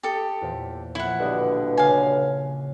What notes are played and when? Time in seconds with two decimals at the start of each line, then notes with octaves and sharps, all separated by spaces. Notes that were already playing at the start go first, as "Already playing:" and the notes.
0.03 G4 A4 D#6 E6 A#6
0.42 E2 A#2 C5
0.95 A#1 E4 F#5 C#7
1.19 G2 B2 D3 E5 D#6 F#6
1.77 C#3 F5 G#5